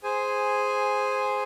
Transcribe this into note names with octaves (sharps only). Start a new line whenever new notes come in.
G#4 C5 G#5